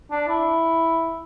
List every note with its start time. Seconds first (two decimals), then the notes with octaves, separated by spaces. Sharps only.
0.11 D4
0.28 E4